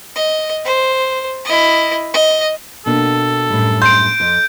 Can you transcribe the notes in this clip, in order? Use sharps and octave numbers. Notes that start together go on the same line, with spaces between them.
D#5
C5
E4 D#5
D#5
B2 A#3 D4 A4
F#2 A2 G3
C6 G6 D7
F2